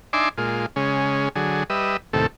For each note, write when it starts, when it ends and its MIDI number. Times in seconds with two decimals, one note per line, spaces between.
0.13 0.29 62
0.13 0.29 63
0.13 0.29 76
0.13 0.29 80
0.13 0.29 84
0.13 0.29 86
0.38 0.66 46
0.38 0.66 56
0.38 0.66 65
0.76 1.29 49
0.76 1.29 56
0.76 1.29 61
1.35 1.64 50
1.35 1.64 54
1.35 1.64 68
1.70 1.97 55
1.70 1.97 71
1.70 1.97 75
1.70 1.97 76
2.13 2.27 39
2.13 2.27 45
2.13 2.27 48
2.13 2.27 69